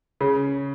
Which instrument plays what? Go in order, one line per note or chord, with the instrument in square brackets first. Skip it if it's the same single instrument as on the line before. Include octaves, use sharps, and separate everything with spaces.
[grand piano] C#3